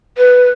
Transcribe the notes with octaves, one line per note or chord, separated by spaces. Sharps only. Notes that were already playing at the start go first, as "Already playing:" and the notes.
B4